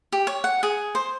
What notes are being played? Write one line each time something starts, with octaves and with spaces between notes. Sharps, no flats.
G4
C#5
F#5
G#4
C5